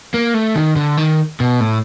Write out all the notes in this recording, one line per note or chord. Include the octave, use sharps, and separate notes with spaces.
A#3
A3
D#3
D3
D#3
B2
A2